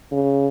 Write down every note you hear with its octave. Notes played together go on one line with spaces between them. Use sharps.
C#3